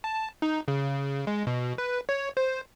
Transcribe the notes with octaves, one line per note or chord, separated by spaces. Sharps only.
A5
D#4
C#3
G#3
B2
B4
C#5
C5